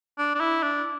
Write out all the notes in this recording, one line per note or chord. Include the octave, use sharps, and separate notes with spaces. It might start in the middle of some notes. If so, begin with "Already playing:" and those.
D4
D4
E4
D4